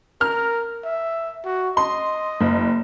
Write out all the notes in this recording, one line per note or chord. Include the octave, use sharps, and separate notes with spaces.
A#4 F6
E5
F#4
D#5 C6
F#1